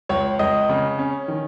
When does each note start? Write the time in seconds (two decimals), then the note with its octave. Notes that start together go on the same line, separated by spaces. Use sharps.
0.09 C#2 C#5
0.39 C#2 D#5
0.69 C#3
0.99 C#4
1.28 D#3